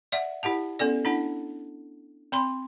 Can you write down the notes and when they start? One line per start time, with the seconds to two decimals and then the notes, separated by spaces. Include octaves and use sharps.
0.12 D5 E5 F#5
0.43 E4 G4 F#5 A5
0.79 B3 C#4 A4 D5
1.05 D4 E4 F#5 A5
2.32 C4 B5 C6